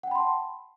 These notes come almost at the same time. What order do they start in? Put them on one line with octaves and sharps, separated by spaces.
F#5 G5 B5 C6 A5